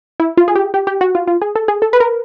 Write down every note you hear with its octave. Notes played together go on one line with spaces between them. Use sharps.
E4
F4
G#4
G4
G4
G4
F#4
F4
F4
G#4
A4
G#4
A4
B4
A#4